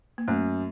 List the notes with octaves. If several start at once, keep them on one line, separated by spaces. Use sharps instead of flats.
A#3
F#2 A3